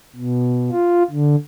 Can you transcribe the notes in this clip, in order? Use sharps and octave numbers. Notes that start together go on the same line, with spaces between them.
B2
F4
D3